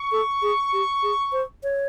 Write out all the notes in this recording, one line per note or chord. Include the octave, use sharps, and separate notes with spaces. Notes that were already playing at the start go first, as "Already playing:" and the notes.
Already playing: C#6
A4
G#4
G4
G#4
C5
C#5